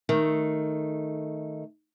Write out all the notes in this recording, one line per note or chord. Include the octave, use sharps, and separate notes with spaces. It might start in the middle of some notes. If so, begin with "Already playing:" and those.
D#3 A3